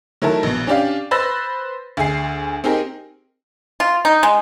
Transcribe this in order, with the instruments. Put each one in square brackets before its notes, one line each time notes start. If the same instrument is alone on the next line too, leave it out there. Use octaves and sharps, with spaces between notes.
[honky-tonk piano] D#3 F#3 A3 E4 A#4 A5
A#1 B2
C#4 D4 G4 D5 F5
B4 C5 B5 E6 A6 A#6
D2 D3 G#4 C7
C4 D#4 G4 G#4 A#4
[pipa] F4
D#4
G#3